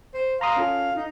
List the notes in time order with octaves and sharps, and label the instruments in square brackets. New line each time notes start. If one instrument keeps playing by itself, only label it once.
[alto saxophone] C5
[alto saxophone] F5 [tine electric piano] A#5 C6 D#6
[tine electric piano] C#4 F4 A4
[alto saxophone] D#4